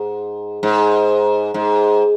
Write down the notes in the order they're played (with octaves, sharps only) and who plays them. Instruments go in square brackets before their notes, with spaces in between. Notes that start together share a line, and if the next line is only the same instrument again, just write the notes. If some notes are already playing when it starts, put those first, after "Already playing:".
Already playing: [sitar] G#2
G#2
G#2